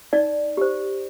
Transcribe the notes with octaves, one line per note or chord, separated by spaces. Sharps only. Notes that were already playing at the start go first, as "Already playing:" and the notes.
D#4 D5
G4 C5